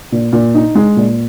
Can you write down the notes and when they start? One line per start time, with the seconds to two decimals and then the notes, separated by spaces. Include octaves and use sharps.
0.12 A#2
0.33 A#2
0.55 D#4
0.75 G#3
0.97 A#2